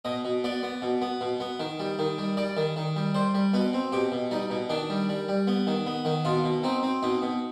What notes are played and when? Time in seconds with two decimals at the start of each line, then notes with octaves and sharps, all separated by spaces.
0.05 B2 D#5
0.25 B2
0.44 B3 D5
0.63 B3
0.82 B2
1.02 B3
1.21 B2
1.40 B3
1.60 D#3
1.80 G3
1.99 D#3
2.18 G3
2.37 G3 D5
2.57 D#3
2.76 D#3
2.96 G3
3.15 G3 C5
3.35 G3
3.54 B2 B4
3.73 C4
3.92 B2 G4
4.12 B2
4.31 G3 D#4
4.51 B2
4.69 D#3 D4
4.90 G3
5.09 G3
5.28 G3
5.47 B3
5.67 D#3
5.86 B3
6.05 D#3
6.25 B2 F4
6.44 B2
6.63 C4 D#4
6.83 C4
7.02 B2 D#4
7.22 B2